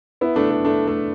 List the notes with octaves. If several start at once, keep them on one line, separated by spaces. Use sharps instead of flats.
B3 E4
A3 D4
A3
A3 D4
A3